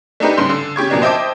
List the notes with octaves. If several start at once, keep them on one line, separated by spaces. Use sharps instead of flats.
A3 D4 D#4 G4 B4
G2 C#3 C6
D3
C#3 G4 C#6 G#6
F2 B2 A#3 B3 D4
C5 D#5 E5 G5 A5 D6